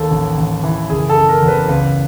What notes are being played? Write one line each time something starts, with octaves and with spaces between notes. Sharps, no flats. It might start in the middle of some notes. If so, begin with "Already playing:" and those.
Already playing: D#2 A4
A1
A1
E3
F#1 G#4
A4
F#1
A#4
E2
B4
C#2 B4